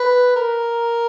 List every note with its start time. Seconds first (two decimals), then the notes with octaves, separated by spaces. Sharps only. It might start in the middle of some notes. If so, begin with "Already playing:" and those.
Already playing: B4
0.36 A#4